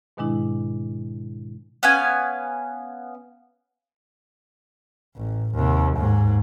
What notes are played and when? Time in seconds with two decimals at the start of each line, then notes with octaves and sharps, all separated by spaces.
0.17 G#2 B2 D#3 G#3 D4 E4
1.83 B3 C#4 F5 G#5
5.17 A1
5.55 D#2 C3
5.97 D#2 G#2